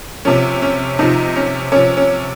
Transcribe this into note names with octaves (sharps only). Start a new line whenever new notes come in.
C3 F3 C#4
C#4
C3 F3 D#4
C#4
C3 F3 C#4
C#4